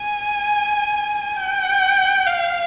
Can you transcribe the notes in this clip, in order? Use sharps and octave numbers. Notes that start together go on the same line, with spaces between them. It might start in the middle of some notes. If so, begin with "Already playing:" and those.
Already playing: G#5
G5
F5